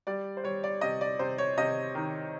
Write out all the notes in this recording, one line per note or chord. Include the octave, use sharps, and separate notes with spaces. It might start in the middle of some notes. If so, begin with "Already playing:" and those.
G3 D5
C5
G3 C#5
D5
C3 D#5
D5
C3 C5
C#5
C3 D#5
D#3